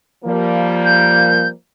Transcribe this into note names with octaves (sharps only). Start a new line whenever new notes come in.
F3 G3 A#3
G6